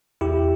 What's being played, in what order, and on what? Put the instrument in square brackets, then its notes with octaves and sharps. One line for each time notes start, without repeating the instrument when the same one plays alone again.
[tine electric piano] E2 E4 G4